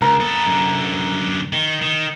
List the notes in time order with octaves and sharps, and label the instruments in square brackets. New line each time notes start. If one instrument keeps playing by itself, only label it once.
[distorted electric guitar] C#2 [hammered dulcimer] A#4
[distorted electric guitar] B3 A4
F#2 D3
D#3
D#3